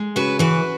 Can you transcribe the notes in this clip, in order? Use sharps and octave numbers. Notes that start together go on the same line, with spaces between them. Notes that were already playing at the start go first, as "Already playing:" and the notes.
Already playing: G#3
C#3 F#4 B4
E3 F#4 B4